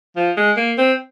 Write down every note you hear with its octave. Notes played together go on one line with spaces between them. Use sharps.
F3
G#3
A#3
C4